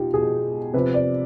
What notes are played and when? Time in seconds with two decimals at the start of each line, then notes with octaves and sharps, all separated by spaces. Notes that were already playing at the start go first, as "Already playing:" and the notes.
Already playing: B2 D#4 F4 G4
0.14 B2 G#4
0.74 C3 F3 B4
0.94 D5